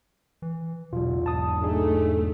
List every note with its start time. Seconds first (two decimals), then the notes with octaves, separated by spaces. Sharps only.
0.42 E3
0.93 E1 B2 F#3 F4
1.26 G#2 A5 D#6
1.63 A3 D4 D#4 G#4